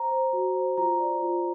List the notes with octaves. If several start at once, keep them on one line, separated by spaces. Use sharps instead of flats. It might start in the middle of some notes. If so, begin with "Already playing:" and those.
Already playing: C5 A#5
C5
F#4
C5
F4 A#5
D5
F4